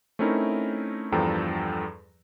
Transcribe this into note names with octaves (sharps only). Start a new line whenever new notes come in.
A3 C4 C#4 D#4 E4 A#4
E2 G2 F3 A4 G5 A#5